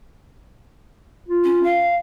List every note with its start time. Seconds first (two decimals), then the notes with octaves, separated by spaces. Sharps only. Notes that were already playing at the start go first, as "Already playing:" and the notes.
1.28 F4
1.44 C#4
1.64 F5